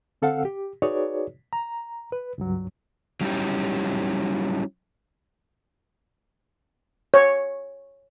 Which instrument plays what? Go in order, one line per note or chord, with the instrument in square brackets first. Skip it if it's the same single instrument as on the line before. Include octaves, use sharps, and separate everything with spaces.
[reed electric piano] D3 C4 A4 F5 F#5
G4
D#4 F#4 G#4 B4 C#5 D5
A#5
B4
C#2 G2 F#3
[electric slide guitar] F#3 G3 C#4 D#4 E4 G4
[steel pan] C#5